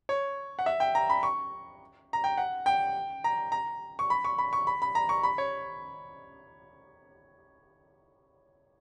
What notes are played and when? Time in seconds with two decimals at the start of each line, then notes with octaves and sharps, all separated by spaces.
0.09 C#5
0.59 F#5
0.66 E5
0.80 G5
0.95 A#5
1.10 B5
1.23 C#6
2.13 A#5
2.24 G5
2.38 F#5
2.66 G5
3.24 A#5
3.52 A#5
3.99 C#6
4.10 B5
4.25 C#6
4.38 B5
4.53 C#6
4.67 B5
4.82 B5
4.95 A#5
5.09 C#6
5.23 B5
5.38 C#5